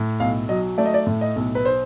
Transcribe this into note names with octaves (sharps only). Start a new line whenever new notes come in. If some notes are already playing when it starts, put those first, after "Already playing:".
Already playing: A2
B1 F5
F#3 D#5
A3 D5
D#5
D5
A2
D#5
B1
B4
C5